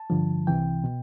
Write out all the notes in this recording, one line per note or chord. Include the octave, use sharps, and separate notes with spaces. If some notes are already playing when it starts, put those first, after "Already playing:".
Already playing: A5
G2 D3 F3
C2 C3 E3 G5
B2